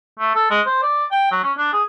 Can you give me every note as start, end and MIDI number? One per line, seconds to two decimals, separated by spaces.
0.19 0.34 57
0.35 0.48 69
0.50 0.61 56
0.66 0.80 72
0.83 1.05 74
1.12 1.27 79
1.31 1.40 54
1.44 1.52 61
1.58 1.72 62
1.73 1.83 68